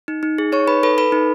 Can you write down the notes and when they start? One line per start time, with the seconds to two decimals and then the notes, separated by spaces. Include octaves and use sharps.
0.08 D#4
0.23 D#4
0.38 G#4
0.52 D#4 C#5 C#6
0.67 D#4 B4 B5
0.83 A4 B4 B5
0.98 A4 B4 B5
1.12 D#4